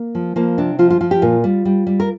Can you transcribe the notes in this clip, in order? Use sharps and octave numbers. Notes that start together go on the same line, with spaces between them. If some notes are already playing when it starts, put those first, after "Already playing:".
Already playing: A#3
F3
F3 A#3
C3 D4
F3 F4
F4
F3 F4
G4
A#2 F4
G3
G3
G3
A#4